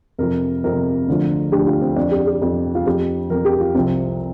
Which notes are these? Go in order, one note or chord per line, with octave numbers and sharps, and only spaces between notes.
F2 C3 F3 A#4
F2 C3 F3 A#4
D2 D3 F3
D2 D3 F3 G4
F4
C4
F2 F3 D4
G4
G4
F2 F3
F4
F2 F3 G4
F2 F3 A#4
G4
F4
C2 C3 F3 C4